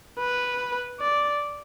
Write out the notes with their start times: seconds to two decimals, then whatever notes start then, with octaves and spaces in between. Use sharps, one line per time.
0.19 B4
1.00 D5